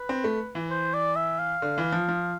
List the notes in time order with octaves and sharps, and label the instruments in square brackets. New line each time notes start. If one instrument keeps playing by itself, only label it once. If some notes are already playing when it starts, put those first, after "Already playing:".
Already playing: [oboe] B4
[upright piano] C4
A3
E3
[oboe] C5
D5
E5
F5
[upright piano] D3
E3
F3
F3